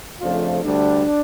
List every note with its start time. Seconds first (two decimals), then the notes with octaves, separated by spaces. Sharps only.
0.21 F2 C#3 F3 A3 D4 F4
0.63 D2 D3 G3 D4